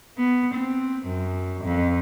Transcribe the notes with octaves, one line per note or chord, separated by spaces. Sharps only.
B3
C4
F#2
F2